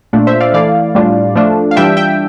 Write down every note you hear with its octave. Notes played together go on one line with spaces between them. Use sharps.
A#2 A3 D4 F4
C5 E5
D5 F5
E3 A3 E4 D5 F5
A2 G3 D4 F4
F3 A3 D4 F4
F5
E3 G3 D4 F4 E5 G5
E5 G5